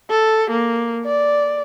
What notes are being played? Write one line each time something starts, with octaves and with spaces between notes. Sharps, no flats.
A4
A#3
D5